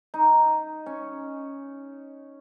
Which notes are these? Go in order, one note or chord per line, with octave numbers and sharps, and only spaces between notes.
D#4
C#4